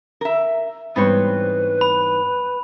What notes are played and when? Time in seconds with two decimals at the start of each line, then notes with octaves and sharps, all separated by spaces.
0.21 A#4 E5
0.96 G#2 E3 G3 B3 C4 B4 C#5
1.81 B5